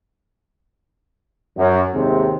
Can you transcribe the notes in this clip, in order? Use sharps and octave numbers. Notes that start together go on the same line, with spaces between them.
F#2
G#1 D#2 C3 G#3 C4